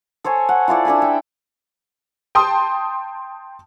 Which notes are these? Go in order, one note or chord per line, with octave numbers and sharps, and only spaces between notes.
A4 C5 C#5 G#5
F#5
E4 F4 A4 D5
D4 A4 E5 G#5
G5
G5 A5 C6 D#6